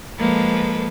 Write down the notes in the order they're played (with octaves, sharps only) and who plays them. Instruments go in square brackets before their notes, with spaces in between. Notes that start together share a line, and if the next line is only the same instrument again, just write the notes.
[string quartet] F3 G#3 A#3 A4 B4